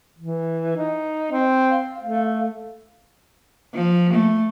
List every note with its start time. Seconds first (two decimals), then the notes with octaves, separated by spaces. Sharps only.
0.18 E3
0.76 D#4
1.31 C4
1.69 F5
2.02 A3
3.74 F3
4.13 A3